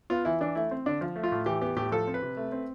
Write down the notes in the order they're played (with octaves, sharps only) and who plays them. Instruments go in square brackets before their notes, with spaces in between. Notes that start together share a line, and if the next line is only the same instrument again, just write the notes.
[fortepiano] B3 F4
E3 E4
E3 D4
A3 E4
C4
D3 D4
F3
A3
F4
A2
E3 G4
B3 G4
A2 G4
F3 A4
C4
B4
C3
A3
C4